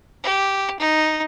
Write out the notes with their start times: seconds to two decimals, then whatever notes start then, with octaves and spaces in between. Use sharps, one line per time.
0.23 G4
0.79 D#4